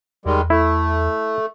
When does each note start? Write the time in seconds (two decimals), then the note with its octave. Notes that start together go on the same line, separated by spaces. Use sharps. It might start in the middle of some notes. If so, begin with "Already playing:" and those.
0.26 E2 D#3 G3 G#3
0.50 A3 E4